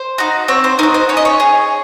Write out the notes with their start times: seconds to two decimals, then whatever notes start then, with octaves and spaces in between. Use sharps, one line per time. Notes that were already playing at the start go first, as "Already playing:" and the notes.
Already playing: C5
0.18 D#4 F#4
0.48 C4 C#5
0.64 C5
0.79 D#4 A#4
0.83 F#4
0.94 C5
1.09 C#4 C#5
1.17 D#5
1.25 C#5
1.40 G#4